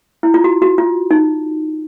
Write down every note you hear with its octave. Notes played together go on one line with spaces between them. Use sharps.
E4
F4
F#4
F#4
F4
D#4